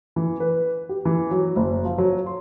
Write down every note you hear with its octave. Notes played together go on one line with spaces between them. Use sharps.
E3
B4
G4
E3
F#3
F#1
F3
F#3
C6